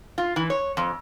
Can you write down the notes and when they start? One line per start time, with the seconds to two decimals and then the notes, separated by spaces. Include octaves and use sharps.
0.18 F4
0.36 E3
0.50 C#5
0.77 F2